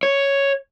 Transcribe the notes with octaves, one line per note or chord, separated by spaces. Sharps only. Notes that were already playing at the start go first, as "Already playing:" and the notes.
C#5